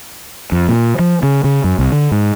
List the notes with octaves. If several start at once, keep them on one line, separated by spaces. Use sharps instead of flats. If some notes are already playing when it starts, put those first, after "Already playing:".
F2
A#2
F3
C#3
C#3
F#2
C2
D3
G#2